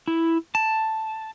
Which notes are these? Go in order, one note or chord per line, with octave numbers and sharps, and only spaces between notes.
E4
A5